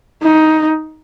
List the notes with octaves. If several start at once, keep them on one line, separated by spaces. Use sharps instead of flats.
D#4